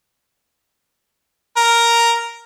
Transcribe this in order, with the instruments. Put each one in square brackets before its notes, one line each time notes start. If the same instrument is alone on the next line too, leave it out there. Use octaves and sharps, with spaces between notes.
[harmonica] A#4